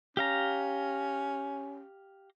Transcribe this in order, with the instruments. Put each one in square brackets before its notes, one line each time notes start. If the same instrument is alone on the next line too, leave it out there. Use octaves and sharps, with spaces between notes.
[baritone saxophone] C#4 [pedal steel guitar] G4 F5 A#5